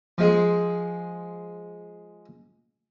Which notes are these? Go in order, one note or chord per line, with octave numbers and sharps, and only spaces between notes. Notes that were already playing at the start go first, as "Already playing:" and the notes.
F3 G#3 G#4